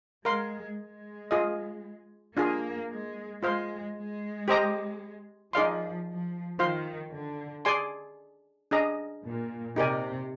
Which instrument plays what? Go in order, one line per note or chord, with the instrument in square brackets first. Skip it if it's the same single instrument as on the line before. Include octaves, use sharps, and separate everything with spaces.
[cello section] G#3 [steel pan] A#4 F5 C6
[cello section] G#3
[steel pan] F4 G#4 D#5
[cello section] A#3 [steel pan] D4 F4 G#4
[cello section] G#3
[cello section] G#3 [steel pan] F4 C5 F5 C6
[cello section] G#3
[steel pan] G4 C5 D#5 A#5
[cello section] F3 [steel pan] D#4 G#4 D5 F5 C6
[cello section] F3
[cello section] D#3 [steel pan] F4 C5 F5 C6
[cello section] D3
[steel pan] G#4 D5 G#5 C6
D4 G#4 D#5 A#5
[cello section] A#2
[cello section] C3 [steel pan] D#4 G4 A#4 D5 G#5